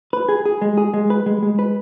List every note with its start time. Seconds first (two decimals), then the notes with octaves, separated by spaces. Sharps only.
0.13 B4
0.29 G#4
0.45 G#4
0.62 G#3
0.77 G#4
0.94 G#3
1.10 B4
1.26 G#3
1.43 G#3
1.59 B4